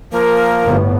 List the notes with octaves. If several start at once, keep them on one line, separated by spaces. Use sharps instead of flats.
F3 A#3 A#4
G1 A2 B3